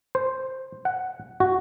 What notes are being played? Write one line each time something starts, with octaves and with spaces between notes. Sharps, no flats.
C5
F#5
F#4